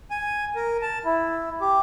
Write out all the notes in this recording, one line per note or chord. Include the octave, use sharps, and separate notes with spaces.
G#5
A#4
A5
E4
G4